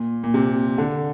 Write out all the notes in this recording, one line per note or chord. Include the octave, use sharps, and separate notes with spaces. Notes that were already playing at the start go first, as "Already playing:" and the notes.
Already playing: A#2
A#2
C3
D3